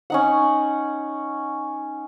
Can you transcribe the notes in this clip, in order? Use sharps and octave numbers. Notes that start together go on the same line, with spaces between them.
C#4 D#4 F#5